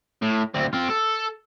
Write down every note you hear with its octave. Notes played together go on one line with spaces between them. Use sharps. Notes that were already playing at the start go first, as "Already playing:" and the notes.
A2
D2 C4
C4 F4
A4